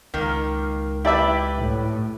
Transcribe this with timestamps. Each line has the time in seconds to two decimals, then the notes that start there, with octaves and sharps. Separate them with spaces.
0.14 C#2 D#3 A#3 A#4
1.05 E4 G4 B4 D5 E5
1.60 A2